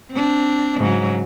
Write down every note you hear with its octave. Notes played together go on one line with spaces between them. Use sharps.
C4 D4
G#2 C#3 F#3